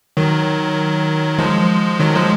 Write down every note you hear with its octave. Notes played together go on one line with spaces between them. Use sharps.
D#3 F#3
F3 G#3
D#3 F#3
F3 G#3